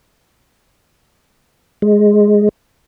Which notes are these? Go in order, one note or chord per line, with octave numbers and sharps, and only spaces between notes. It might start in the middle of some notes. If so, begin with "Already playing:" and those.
G#3